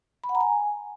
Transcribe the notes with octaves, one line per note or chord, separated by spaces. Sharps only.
B5
F#5
A#5
G#5